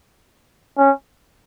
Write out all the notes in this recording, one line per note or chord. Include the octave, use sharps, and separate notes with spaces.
C#4